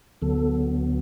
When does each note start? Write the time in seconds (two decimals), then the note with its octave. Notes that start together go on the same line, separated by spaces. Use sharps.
0.22 D2 D3 F#3 B3 A4